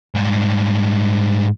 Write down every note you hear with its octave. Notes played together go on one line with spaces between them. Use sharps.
G#2 G3